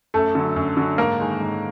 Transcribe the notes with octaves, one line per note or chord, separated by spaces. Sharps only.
F#2 A3 A4
D3 F#3
F#2
D3 F#3
G#2 A#3 A#4
D#3 G#3
G#2